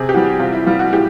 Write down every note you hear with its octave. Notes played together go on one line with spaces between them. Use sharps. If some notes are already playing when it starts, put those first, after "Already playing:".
Already playing: C3 G#4
G4
E3 G3 F#4
C3 F4
E4
E3 G3 F4
F#4
A2 G4